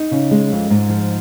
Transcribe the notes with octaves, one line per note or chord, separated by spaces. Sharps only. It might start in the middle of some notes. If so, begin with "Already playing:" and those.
Already playing: D#4
C#3
G#3
F2
G#2
F3